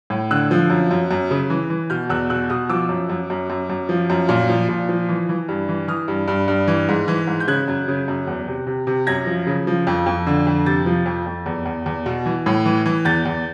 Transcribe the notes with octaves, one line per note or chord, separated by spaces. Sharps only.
A2
D3 E6 F#6
F3
F#2
F#2
F#2
C#3
E3
E3
B2 F6 G6
E2 E6 F#6
B2 E6 F#6
B2 D#6 F6
F3 D6 E6
F#2
F#2
F#2
F#2
F#2
F3
F#2
A#2
F3
A#2
F3
E3
E3
G2
E3
E3 D#6 F6
G2
G2
G2
E3
G#2
E3
G#2
G6
C#3 F#6 G#6
F#2
C#3
F#2
E2
C3
C3
C3
F#2 G#6 A#6
F3
C#3
F3
F2
F2
D3
F2
C3 G6 A6
F3
F2
F2
E2
E2
E2
B2
E3
A2
E3
E3
E2 G6 A6
E2